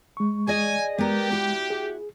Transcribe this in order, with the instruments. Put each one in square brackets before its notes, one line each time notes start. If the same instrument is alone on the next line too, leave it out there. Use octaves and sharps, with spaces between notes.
[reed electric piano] G#3 C#6
[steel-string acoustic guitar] G#4 D5 D#5 [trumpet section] G#5
[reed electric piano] G#3 [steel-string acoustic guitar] B3 A#4 [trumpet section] G4
[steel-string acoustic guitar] E4 F#4
[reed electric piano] G#4